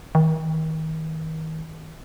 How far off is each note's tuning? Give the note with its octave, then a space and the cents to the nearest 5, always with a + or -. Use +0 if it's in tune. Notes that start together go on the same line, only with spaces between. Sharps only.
D#3 +35